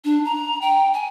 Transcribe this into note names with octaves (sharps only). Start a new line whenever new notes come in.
D4
A#5
G5
G#5